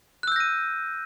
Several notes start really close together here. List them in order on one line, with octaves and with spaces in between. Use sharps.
F#6 E6 G6 A#6 D#7